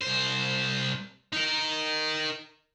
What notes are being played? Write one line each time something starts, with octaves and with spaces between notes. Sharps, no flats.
C2 C5
D#4 A#4